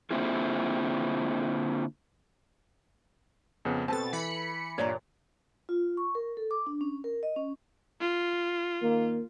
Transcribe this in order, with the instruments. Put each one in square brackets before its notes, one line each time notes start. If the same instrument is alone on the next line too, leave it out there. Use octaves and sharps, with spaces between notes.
[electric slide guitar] D3 A#3 C4 E4 F4 G#4
[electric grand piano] F2 C#3 B3
[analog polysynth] B2 A6 [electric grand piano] C4 [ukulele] A4 B4 A5
[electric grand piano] E3 [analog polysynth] B5 C#7
[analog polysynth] G2 A#2 [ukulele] C#5 D5 A#5
[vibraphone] F4
C#6
A#4
A4
D6
D4
C#4
A#4
D#5
C#4
[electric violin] F4
[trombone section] D#3 A#3